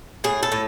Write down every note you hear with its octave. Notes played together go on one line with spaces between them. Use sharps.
A2 G#4
A4
A2